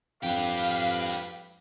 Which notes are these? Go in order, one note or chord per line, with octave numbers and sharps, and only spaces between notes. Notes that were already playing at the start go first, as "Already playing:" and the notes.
F2 G4 B4 F5